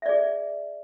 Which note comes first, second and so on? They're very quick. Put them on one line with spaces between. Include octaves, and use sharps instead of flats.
E5 D5 G#4